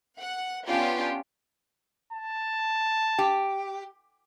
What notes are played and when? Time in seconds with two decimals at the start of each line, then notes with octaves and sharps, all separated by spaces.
0.19 F#5
0.66 B3 C#4 D4 F4 G4
2.13 A5
3.18 G4